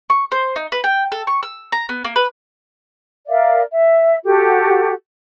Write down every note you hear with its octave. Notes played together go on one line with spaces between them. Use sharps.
C#6
C5
D#4
B4
G5
A4
C#6
E6
A#5
B3
A#3
B4
A#4 D5 E5 F5
E5
F#4 G4 A4